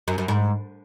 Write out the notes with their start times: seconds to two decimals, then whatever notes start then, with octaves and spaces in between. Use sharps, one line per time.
0.08 F#2
0.18 F#2
0.28 G#2